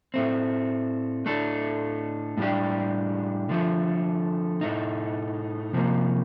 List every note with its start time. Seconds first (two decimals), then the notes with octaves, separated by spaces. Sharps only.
0.14 A2 A3 C4
1.26 A2 A3 D4 A4
2.38 A2 G3 D4 G4
3.49 D3 F3 A3
4.61 A2 A3 D#4
5.73 C3 F3 A#3